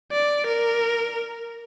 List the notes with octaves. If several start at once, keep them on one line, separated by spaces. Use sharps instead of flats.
D5
A#4